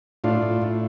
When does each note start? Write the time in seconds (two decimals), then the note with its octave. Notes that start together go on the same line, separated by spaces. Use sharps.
0.24 A2 D4 F4
0.42 A2
0.62 A2